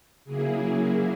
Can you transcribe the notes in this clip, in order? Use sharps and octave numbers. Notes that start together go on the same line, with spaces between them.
C#3 F#3 A#3 E4 G#4